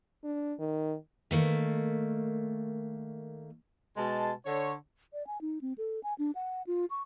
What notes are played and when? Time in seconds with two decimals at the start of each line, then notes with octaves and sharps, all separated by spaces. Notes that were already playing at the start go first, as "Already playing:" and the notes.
0.24 D4
0.59 D#3
1.31 D#3 A3 A#3
3.97 B2 G#3 A5
4.46 D3 C#5
5.13 D5
5.27 G#5
5.41 D#4
5.61 C4
5.78 A4
6.03 G#5
6.18 D4
6.35 F#5
6.67 F4
6.90 C#6